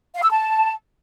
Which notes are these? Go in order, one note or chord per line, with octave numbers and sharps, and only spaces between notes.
F5
E6
A5